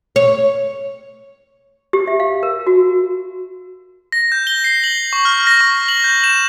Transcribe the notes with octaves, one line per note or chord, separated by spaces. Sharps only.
C#5
G4
E5
F5
A#4
F#4
A#6
G6
G7
C7
F#7
C#6
F6
A#6
C#6
F#7
G6
E7